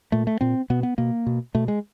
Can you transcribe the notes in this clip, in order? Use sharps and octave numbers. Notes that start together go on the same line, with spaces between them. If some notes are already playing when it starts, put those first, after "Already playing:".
A#2 A3
A3
A#2 C4
B2 B3
B3
B2 A#3
B2
B2 A3
G#3